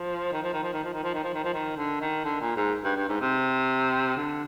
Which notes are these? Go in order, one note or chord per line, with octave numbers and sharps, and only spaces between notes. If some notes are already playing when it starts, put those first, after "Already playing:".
Already playing: F3
D#3
F3
D#3
F3
D#3
F3
D#3
F3
D#3
F3
D#3
F3
D#3
D3
D#3
D3
A#2
G#2
G2
G2
G#2
C3
D3